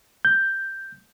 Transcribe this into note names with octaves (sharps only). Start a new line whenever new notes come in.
G6